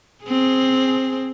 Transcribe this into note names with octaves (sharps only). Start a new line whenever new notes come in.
C4 G#4